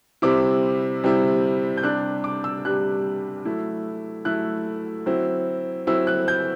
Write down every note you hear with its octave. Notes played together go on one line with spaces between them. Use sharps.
C3 G3 C4 E4 D6
C3 G3 C4 E4
G6
C3 G3 D4 F#6
D6
E6
C3 G3 D4 F#6
F#3 A3 E4
F#3 A3 E4 F#6
F#3 C4 E4
F#3 C4 E4 E6
F#6
G6